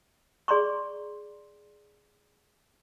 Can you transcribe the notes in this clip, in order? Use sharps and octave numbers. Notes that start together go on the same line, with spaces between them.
G#4 D5 A#5 C6 C#6